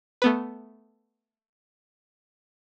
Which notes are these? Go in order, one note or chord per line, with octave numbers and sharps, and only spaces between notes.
A3 B3 B4